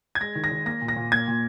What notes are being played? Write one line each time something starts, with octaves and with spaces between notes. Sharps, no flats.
G#6
G#3 A#6
D#3
A#6
D#3
A#3 A#6
A#2
A#6
A#2
A#3 G#6
A#2